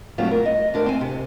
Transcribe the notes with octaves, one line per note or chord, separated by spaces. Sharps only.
F#3 G3 A3 C4 D4 F4
A#4
D#5
D2 D4 A#4
C4 G#5
C3